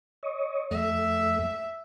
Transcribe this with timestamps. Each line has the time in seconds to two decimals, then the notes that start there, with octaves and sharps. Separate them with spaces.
0.23 C#5 D#5
0.71 F2 A3 E5